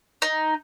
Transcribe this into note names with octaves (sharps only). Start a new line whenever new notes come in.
D#4